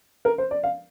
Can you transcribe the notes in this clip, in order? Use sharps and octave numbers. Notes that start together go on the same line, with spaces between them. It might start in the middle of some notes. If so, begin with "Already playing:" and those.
A#4
C5
D5
F5